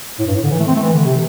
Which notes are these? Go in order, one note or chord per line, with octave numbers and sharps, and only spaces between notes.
A2
G2
A2
D3
E3
A3
C4
A3
E3
D3
C3